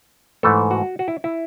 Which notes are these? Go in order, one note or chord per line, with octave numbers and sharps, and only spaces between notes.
G#2 E3 A3 A4
F#4
F#4
E4
E4